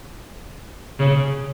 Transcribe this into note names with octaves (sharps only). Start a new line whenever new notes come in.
C#3